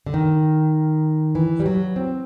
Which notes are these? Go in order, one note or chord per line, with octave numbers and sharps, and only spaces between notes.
D3
D#3
E3
G3
F#3
C4